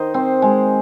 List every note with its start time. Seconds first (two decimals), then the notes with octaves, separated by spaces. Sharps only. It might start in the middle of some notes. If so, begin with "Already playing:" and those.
Already playing: D#3 C5 D#5
0.14 C4
0.42 G#3